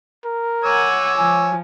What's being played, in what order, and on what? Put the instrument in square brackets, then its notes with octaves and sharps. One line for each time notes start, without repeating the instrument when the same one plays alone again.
[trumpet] A#4
[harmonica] C#5 D6 E6 [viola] F#5 G#5
[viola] F3 [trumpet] G#5